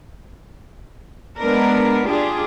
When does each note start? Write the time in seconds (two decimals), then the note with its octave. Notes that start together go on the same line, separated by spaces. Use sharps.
1.39 G#3 B3 D4 A#4 B4
2.07 D4 F4 G4 G#4 D5